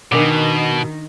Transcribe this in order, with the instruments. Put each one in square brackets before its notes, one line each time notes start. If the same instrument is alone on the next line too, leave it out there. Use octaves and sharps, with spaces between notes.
[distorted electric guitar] B2 [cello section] D#3 [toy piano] D4 A#4 D6